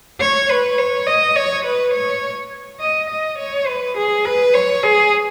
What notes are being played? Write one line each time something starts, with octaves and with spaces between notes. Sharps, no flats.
C#5
B4
C#5
D#5
C#5
B4
C#5
D#5
D#5
C#5
B4
G#4
B4
C#5
G#4